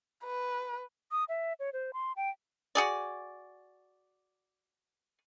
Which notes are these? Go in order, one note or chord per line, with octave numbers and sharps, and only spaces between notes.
B4
D#6
E5
C#5
C5
C6
G5
F#4 G#4 D5